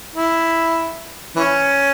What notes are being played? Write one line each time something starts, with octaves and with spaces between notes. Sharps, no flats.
E4
E3 C#4